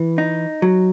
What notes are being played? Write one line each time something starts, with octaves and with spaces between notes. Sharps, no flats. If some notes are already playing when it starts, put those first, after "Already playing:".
Already playing: E3
D#4
F#3